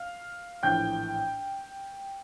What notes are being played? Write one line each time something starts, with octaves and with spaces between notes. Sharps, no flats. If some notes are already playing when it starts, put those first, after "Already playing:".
Already playing: F5 F6
A#1 A2 E3 G5 G6